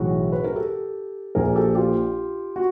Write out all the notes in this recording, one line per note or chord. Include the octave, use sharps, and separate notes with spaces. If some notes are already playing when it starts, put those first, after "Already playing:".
Already playing: B1 A2 E3 F#4 G#4
B4
A#4
G4 A4
A#1 A#2 G#4 A#4
G4 A4
F4 G4
F#4